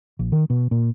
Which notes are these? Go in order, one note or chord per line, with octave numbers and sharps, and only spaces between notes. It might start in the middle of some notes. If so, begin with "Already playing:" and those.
A#1
D#3
B2
A#2